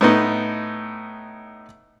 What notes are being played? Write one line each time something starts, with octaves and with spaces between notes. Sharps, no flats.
A2 B3 D#4